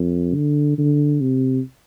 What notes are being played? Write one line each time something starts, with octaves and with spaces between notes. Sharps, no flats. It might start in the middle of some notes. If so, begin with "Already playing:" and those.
Already playing: F2
D3
D3
C3